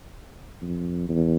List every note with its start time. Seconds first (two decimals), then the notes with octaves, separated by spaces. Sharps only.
0.62 F2
1.09 E2